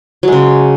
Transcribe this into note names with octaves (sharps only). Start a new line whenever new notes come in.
C#3 F#3 G#3